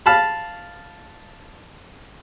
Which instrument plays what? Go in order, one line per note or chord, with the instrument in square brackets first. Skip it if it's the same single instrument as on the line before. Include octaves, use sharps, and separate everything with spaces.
[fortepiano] F5 A5 B5